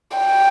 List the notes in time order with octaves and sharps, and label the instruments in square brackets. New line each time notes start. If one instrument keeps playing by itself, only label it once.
[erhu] G5